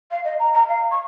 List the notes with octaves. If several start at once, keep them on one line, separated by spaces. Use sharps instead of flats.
F5
D#5
A#5
A#5
F5
C#6